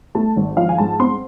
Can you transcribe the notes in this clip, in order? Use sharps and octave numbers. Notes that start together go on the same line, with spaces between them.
A3 A5
G#1
F3 F5
G#5
G#2 A5
C4 C6